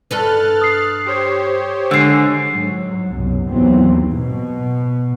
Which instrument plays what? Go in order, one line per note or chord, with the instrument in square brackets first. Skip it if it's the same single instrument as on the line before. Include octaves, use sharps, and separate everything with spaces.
[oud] G2 A4 B4 [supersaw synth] F6 F#6 A6
[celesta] D#6 C7
[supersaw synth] G4 C5 C#5
[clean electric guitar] D3 [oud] G#3 G#4 [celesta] E6 C7
[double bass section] G#2 F#3
C2 F#2 B2
D#2 G#2 E3 F#3 B3 C4
B2